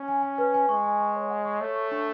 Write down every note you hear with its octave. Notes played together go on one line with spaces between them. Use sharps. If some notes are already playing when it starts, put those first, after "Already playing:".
Already playing: C#4
G#5
G#5
B4
G#5
G#3 C#6
G#5
C#6
C#5
F#5
C#6
A3 C#5
C#6
D4